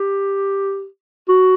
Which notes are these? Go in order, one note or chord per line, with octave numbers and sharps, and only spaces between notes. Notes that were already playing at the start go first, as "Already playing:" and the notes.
Already playing: G4
F#4